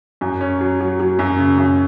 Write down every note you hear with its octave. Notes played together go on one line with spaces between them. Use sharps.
F#2
C#4
F#3
F#3
F#3
F#2
C#3
F#2